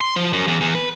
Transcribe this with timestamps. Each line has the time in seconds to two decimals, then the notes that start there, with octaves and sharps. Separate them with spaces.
0.01 C6
0.16 F3
0.33 F#2
0.47 E2
0.61 E2
0.75 B4